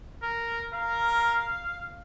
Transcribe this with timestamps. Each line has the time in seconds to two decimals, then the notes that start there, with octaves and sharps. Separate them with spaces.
0.23 A#4
0.73 A#4 F5